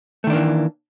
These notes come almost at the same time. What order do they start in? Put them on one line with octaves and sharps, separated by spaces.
A3 D#3 D4 A#3 E3